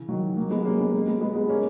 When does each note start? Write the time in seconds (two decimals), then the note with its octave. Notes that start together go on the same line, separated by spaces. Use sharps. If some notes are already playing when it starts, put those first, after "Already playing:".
Already playing: C#3 E3
0.09 D#3 F#3
0.37 F#3 A#3
0.51 G#3 B3
0.65 A#3 C#4
0.80 G#3 B3
1.07 G#3 B3
1.21 G#3 B3
1.36 G#3 B3
1.49 A#3 C#4